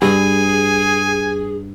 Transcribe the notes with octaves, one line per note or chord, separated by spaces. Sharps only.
G2 G#4 G#5